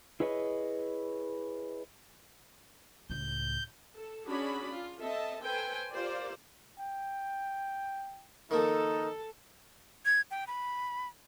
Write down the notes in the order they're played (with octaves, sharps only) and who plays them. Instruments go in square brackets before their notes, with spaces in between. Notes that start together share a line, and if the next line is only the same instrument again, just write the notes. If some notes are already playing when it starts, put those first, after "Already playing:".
[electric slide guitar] E4 G#4 B4 C#5 D#5
[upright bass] C#2 A2 [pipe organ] G6
[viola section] A4
C#4 D4 F#4 G#4 D5 B5
F4
C4 A4 D#5 E5 A5
A4 B4 C5 G5 G#5
F4 G4 A#4 C5 D5
[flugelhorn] G5
[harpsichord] D#3 F3 A#3 [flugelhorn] D#4 [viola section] A4
[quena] G#6
G5
B5